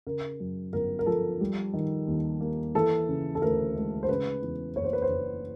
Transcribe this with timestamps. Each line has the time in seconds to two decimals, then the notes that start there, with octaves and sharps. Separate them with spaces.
0.07 C#3 A#4
0.40 F#2
0.73 G1 A#4
0.99 A#4
1.06 F3 A4
1.41 G3
1.73 D#3
2.07 D#2
2.41 A#3
2.75 E3 A4
3.08 C#3
3.35 A4
3.42 D2 A#4
3.76 G#3
4.03 C5
4.09 C#3 B4
4.42 E2
4.76 F#1 C#5
4.84 C5
4.93 B4
5.02 C5
5.09 F#1